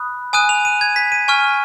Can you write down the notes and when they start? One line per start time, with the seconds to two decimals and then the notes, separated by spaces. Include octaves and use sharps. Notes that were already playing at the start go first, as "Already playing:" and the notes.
Already playing: B5 D#6 F#6
0.33 G#5 D#6 F#6 D#7
0.49 F7
0.65 D#7
0.81 G#6
0.96 B6
1.12 D#7
1.28 G#5 C#6 F6